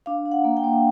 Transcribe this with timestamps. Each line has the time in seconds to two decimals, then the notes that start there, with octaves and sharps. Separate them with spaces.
0.06 D4 F5
0.25 D4
0.32 F#5
0.44 A#3
0.57 G5
0.64 A#3